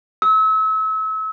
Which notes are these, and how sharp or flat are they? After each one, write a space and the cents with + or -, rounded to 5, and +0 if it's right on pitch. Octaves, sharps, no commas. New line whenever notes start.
E6 -35